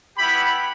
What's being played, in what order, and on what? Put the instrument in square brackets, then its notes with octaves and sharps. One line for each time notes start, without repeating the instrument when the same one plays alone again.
[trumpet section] B3 E4 G4 B5